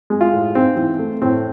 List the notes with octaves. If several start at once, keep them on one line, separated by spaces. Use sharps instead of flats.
G#3
F4
A2
G#2 C4
E3
A3
A2 C4